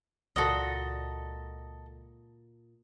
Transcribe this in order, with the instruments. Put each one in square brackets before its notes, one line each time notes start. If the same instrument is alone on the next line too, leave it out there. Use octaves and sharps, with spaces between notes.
[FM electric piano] C#2 [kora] A#2 F#4 D5 [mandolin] A4 D#5